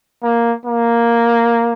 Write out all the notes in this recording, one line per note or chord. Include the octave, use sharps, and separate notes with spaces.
A#3
A#3